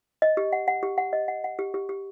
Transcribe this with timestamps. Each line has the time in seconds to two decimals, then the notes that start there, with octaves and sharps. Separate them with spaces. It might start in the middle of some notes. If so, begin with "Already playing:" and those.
0.22 D#5
0.37 G4
0.53 F#5
0.68 F#5
0.83 G4
0.98 F#5
1.13 D#5
1.28 F#5
1.44 F#5
1.59 G4
1.74 G4
1.89 G4